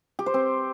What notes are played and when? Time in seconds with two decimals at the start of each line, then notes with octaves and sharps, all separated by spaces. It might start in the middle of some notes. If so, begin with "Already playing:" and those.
0.19 G4
0.26 C5
0.34 C4